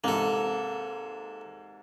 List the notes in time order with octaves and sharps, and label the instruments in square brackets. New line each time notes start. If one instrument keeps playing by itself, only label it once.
[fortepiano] G#2 C3 [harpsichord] A#3 A4